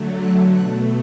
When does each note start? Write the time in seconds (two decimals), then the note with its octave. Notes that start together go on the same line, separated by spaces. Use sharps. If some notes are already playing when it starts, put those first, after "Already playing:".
Already playing: D3 F#3 A3
0.18 F#6
0.50 B2 A3 F#6